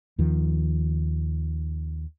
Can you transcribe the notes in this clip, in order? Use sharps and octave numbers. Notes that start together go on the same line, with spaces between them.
D#2 D#3 F3